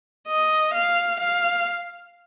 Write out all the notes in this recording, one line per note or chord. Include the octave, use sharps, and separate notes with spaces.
D#5
F5
F5